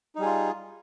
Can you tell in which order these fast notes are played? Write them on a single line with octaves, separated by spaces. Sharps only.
D#4 G3 G#4 F4